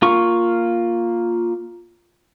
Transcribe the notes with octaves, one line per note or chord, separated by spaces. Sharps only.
A#3 F4 C#6